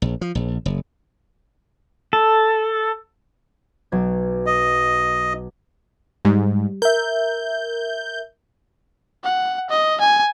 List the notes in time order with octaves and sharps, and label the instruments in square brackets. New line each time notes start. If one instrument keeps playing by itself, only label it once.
[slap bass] A#1
F3
A#1
F#1
[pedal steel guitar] A4
[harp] B1 G#6
[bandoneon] D#5
[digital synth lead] G#2 [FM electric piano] G3
[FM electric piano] A#4 E5 [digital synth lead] G6
[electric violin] F#5
D#5
G#5